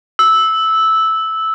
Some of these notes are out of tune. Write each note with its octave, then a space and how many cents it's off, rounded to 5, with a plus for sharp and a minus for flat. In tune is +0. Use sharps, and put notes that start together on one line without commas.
E6 -10